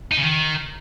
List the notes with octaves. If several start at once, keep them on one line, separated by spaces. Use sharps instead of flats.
D#4
C#3
D#3